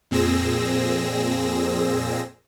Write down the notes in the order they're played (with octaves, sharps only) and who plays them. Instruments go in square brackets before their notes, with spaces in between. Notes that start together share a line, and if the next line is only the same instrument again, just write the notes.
[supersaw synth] F2 A#2 C4 G#4 E6 A#6